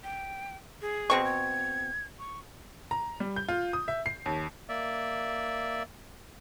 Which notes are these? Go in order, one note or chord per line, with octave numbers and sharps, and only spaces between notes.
G5
G#4
B2 C4 C#6
G#6
C#6
A#5
G3
G6
F4
D#6
E5
C7
D#2
A#3 D5 E5